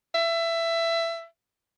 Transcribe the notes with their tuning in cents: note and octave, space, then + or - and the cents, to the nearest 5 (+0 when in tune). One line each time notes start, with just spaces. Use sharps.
E5 +20